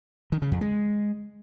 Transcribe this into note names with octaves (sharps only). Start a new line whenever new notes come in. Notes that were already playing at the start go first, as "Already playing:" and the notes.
D#3
C#3
F2
G#3